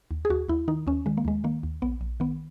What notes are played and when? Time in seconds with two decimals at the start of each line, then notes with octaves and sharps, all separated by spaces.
0.11 D#2
0.25 G#4
0.30 D#2 F#4
0.49 D#2 E4
0.68 D#3 D#4
0.87 D#2 C#4
1.06 D#3 G#3
1.17 A#3
1.25 D#2 G#3
1.44 D#3 A#3
1.63 D#2
1.82 A#1 B3
2.01 A#1
2.20 D#3 B3